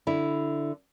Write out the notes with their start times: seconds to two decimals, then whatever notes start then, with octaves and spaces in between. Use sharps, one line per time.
0.07 D3 E4